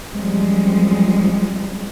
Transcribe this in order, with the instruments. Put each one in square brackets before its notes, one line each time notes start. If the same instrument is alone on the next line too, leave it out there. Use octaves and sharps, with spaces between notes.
[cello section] F#2 F3 G3 G#3 C4